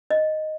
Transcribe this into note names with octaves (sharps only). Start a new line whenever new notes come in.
D#5